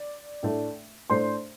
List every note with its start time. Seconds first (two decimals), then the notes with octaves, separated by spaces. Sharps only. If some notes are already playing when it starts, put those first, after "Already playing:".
Already playing: D5
0.43 A2 A3 D4
1.10 A2 A3 D4 C5 C6